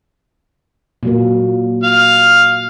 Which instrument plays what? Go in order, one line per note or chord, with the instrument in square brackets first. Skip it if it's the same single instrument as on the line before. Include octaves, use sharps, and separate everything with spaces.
[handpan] A#2 F#3 A#3
[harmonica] F5